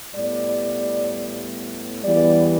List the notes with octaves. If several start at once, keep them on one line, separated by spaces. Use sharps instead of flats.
A2 G3 B3 D5
E2 E3 G3 B3 D5